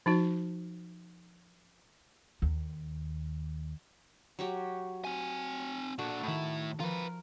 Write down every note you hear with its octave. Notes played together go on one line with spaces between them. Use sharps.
F3 D#4 F#4
D#2
F#3 F#4 G4
C4 G#5
A#2 D4 F#4 A4
A2 D#3 E4 A5 B5
F3 F4 A#4 B4